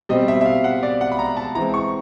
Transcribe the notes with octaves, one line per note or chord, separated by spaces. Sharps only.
B2 G3 C4 D#5
E5
E5
F5
F#5
D5
F#5
B5
A#5
A5
E3 G#3 C4 A#5
C#6